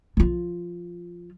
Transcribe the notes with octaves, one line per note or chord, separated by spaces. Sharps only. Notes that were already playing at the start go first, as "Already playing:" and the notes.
F3 F4